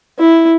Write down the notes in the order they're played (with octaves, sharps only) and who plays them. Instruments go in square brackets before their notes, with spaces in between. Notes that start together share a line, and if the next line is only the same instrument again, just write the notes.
[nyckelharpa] E4